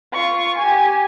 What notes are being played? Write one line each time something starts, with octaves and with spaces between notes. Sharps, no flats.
F4 C#6
G4 G#5